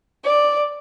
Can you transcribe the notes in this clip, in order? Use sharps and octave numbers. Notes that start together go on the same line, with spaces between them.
D5